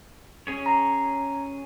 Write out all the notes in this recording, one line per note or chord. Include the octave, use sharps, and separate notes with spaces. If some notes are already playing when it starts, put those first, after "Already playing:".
C#4 G#4 C#5
A#5